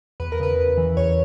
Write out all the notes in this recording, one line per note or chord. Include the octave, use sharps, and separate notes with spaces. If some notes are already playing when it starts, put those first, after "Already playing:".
E2 B4
A#4
C#3 B4
E2
E3
E2 C#5